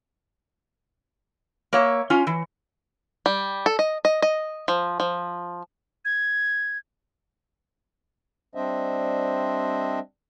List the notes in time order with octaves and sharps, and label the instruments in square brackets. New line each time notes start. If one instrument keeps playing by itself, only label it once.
[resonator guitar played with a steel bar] A#3 C#5 E5
C#4 F4
E3
[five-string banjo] G3
A4
D#5
D#5
D#5
F3
F3
[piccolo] G#6
[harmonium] G3 C4 D4 C5 D#5 E5